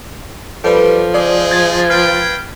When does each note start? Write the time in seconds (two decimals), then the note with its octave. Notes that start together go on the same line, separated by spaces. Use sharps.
0.64 F3 G3 A4 B4
1.14 G#3 C4 G#4 D5
1.51 G#6 A6
1.90 B4 F5 G5